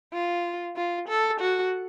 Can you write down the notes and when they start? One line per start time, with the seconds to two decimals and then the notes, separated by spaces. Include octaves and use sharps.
0.14 F4
0.76 F4
1.08 A4
1.40 F#4